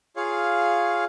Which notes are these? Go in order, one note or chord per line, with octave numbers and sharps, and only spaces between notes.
F4 G#4 C#5 F5